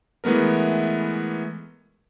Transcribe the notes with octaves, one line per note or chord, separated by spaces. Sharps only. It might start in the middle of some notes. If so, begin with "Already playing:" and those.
E3 G#3 A3 B3 A#4